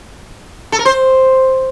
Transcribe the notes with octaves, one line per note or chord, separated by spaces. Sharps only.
A4
A#4
C5